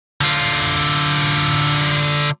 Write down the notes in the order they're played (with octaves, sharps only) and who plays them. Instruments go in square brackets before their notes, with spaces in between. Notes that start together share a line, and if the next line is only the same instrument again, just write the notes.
[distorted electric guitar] D3 F4